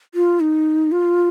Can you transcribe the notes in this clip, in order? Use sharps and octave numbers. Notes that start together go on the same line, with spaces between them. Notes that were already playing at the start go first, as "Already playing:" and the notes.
F4
D#4
F4